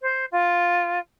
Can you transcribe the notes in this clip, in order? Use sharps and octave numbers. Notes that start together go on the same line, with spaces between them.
C5
F4